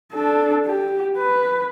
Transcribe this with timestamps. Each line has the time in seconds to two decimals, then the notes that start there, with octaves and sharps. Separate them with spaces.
0.14 D4 A4
0.66 G4
1.18 B4